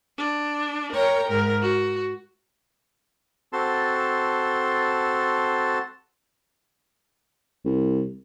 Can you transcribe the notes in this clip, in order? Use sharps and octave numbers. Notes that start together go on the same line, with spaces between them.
D4
A#4 C#5 G5 A#5
G#2 A#4
F#4
C4 F#4 A4 A5 C6
C2